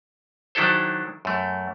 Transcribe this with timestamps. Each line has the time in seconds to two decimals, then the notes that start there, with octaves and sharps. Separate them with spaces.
0.55 D#3 F#3 D4 E4 A4 C5
1.25 F#2 A3